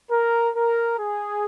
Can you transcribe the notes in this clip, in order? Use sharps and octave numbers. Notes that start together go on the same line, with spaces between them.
A#4
A#4
G#4